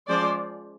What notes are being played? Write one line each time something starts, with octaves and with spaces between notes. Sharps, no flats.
F3 G#3 C#4 C5 D5